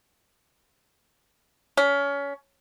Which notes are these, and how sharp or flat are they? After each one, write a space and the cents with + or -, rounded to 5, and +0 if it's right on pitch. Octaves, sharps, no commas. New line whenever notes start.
C#4 +25